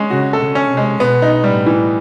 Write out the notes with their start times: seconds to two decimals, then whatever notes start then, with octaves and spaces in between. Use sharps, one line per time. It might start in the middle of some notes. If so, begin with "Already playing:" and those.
Already playing: G#3 C#4
0.10 C#3 F#4
0.33 A4
0.41 C#3
0.55 C#4
0.70 C3
0.77 G#3
0.99 B2 B3
1.22 D#4
1.44 A2 G3
1.66 E3